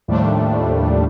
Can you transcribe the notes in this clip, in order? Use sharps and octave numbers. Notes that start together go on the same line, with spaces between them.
D#2 A2 F3 G3 A3 D4